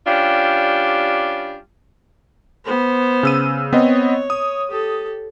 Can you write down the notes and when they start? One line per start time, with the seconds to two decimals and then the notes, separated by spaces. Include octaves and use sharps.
0.07 G3 C#4 D4 F4 G4
2.65 B3 C5
3.23 C#3 E6 D#7
3.73 B3 C4 C#5 D#5
4.30 D#6
4.69 G4 A4